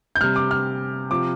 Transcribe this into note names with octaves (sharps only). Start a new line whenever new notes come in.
G6
C3 G3 F6
D6
F6
C3 F3 D6